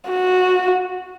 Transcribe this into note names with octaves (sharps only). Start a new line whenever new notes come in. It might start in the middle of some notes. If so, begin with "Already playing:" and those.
F#4